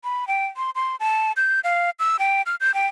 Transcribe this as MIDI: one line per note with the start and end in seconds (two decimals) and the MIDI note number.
0.04 0.27 83
0.28 0.46 79
0.57 0.70 84
0.75 0.96 84
1.00 1.32 81
1.37 1.60 91
1.64 1.90 77
1.99 2.17 88
2.19 2.42 79
2.46 2.56 89
2.61 2.74 91
2.74 2.87 79